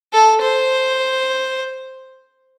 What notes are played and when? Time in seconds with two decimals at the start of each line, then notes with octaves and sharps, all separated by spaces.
0.13 A4
0.42 C5